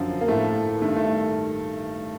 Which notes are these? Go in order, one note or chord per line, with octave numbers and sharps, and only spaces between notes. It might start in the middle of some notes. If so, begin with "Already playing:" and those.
Already playing: F#2 D3 F3
A#3
A2 F3 A3
G2 D#3 A3
A3